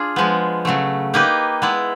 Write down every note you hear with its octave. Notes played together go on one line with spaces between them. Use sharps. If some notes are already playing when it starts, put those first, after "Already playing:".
Already playing: D4 F4 G#4
F3 G#3 B3
C#3 F#3 A3
A#3 D#4 G4 B4 D#5
G#3 B3 E4